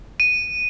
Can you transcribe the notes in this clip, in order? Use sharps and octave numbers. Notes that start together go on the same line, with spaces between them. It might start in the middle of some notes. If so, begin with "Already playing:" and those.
D#7